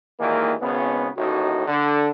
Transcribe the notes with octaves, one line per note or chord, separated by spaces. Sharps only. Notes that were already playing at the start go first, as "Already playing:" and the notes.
D#2 A#2 D#3 E3 G#3 A#3
G#1 C#3 B3
A1 D#2 A2 D#4 F#4
D3